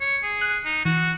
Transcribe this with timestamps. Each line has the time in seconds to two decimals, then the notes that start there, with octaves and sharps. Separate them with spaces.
0.01 C#5
0.23 G#4
0.41 F#6
0.65 D#4
0.85 E3 F#4